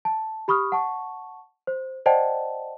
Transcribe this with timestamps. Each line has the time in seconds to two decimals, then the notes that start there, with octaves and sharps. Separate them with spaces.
0.05 A5
0.48 G4 B5 C#6 D#6 F6
0.72 F#5 A5 C#6
1.67 C5
2.06 C5 D5 D#5 F#5 G5 A5